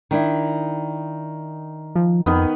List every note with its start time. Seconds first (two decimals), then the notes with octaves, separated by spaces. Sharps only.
0.11 D#3 D4 E4
1.95 F3
2.26 F2 D#3 B3